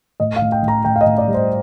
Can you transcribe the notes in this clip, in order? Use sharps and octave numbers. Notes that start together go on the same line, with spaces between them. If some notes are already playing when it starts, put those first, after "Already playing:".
A2 D#5
F5
A2
G5
A2
A#5
A2 G5
F5
D#5
A2
D5
G3
C5